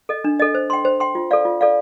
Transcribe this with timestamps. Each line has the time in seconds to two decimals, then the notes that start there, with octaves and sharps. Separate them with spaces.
0.09 A4 D#5
0.24 D4
0.40 A4 D#5
0.55 C5
0.70 G5 C6
0.85 C5
1.00 G5 C6
1.15 F4
1.31 A4 D5 F5
1.45 F4
1.61 A4 D5 F5